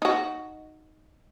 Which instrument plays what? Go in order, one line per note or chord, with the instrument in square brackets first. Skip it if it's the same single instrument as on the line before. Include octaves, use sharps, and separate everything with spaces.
[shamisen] D#4 F#4